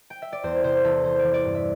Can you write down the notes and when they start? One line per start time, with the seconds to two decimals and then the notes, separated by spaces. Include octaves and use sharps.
0.10 G5
0.22 E5
0.32 D5
0.43 E2 C5
0.64 C3 C5
0.84 E2 A4
1.04 E3 C5
1.19 E3 D5
1.34 D5
1.44 G2
1.55 E5